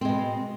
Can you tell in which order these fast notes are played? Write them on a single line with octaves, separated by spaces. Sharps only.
C4 G#3 B2